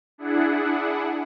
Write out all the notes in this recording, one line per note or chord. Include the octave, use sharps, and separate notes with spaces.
D4 E4 G#4 F#5